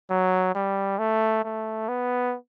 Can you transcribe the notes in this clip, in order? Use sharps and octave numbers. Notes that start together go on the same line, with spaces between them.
F#3
G3
A3
A3
B3